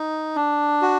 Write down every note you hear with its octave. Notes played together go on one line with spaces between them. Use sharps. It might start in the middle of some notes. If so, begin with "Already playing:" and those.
Already playing: D#4
D4
F#4